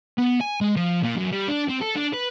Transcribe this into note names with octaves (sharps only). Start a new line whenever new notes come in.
B3
G#5
G#3
F3
A#2
F#2
G3
D4
C4
A4
D4
B4